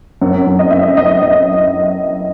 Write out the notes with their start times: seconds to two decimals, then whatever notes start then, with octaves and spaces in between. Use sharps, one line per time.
0.22 F#2
0.47 F#2
0.59 D#5
0.71 F#2 E5
0.83 D#5
0.97 F#2 D#5
1.22 F#2 D#5